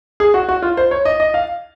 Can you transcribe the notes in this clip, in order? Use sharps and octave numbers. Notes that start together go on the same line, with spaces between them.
G#4
F#4
F#4
F4
C5
C#5
D#5
D#5
F5